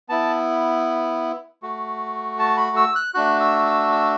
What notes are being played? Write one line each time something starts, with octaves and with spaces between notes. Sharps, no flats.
B3 E4 A5
A3 F#4
A5
B5
E6
F#6
A3 D4 F#4 F#6
E6
E6
E6